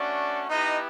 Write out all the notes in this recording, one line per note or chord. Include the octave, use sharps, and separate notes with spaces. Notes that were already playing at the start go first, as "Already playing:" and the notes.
Already playing: A3 C#4 D4 F#4 D5
B3 D#4 E4 G4 D#5